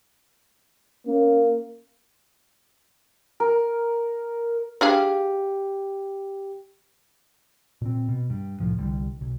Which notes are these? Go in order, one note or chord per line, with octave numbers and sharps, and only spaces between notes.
A#3 C#4
A#4
D4 G4 G#4 F5
A#2 C4
B2
G2
C2 A2 F3
C2 D3 G3
B1